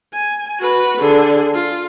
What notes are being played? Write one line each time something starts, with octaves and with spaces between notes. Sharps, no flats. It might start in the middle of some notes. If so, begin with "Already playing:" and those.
G#5
F#4 B4
D3 G#4
F4